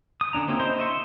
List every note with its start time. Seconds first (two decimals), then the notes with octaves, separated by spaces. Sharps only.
0.21 D#6
0.33 D3 C#4 D4 A#5
0.48 A#3 C4 C#4 E4 G4
0.60 E4 C5 D#5 C6
0.79 D#5 E5 C6 C#6